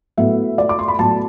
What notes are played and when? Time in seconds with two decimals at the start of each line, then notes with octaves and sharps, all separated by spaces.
0.17 A2 F#3 B3 E5
0.58 D5
0.69 D6
0.79 C6
0.88 B5
0.99 A2 F#3 B3 A5